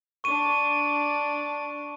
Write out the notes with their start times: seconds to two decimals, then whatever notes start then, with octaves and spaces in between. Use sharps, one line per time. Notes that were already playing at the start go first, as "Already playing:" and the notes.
0.24 D4 C#6 D#7